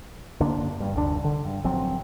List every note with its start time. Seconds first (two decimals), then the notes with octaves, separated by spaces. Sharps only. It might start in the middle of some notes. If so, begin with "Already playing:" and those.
0.40 F#2 D3 A#3 D4
0.80 G2
0.95 F1 D2 B2 D4
1.24 D3
1.45 G2
1.64 A1 F3 F#3 C4